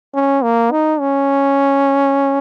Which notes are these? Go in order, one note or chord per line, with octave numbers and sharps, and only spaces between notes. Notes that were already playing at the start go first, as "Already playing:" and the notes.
C#4
A#3
D#4
C#4